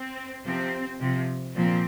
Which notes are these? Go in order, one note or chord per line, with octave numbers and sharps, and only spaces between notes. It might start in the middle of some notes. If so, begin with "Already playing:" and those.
Already playing: C4
C3 F3 C4
C3 F3
A#2 F3 C4